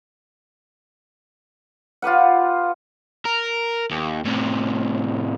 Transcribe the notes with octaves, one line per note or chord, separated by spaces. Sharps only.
F4 G4 B4 F#5
A#4
D#2
A2 C3